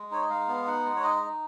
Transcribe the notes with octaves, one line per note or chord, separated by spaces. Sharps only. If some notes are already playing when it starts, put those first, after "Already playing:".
Already playing: G#3
D#4 C#5
D#5
G#3 F5
B3
D#4 F#5
G#3
C#5
D#4 D#5
D#4